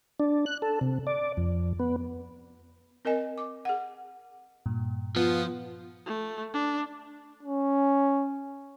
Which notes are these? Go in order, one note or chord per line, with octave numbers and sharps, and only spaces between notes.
D4
F#6
A4
C3
D5
F2
B3
C4 A#4 D#5 G#5
D6
G#4 F#5
G2 A#2
F3 B3 F4
A3
D4
C#4